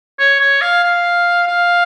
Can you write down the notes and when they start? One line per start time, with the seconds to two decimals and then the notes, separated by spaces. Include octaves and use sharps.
0.19 C#5
0.41 C#5
0.62 F5
0.84 F5
1.48 F5